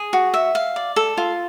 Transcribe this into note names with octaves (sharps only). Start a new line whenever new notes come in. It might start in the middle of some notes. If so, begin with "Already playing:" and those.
Already playing: G#4
F#4
E5
F5
D5
A4
F4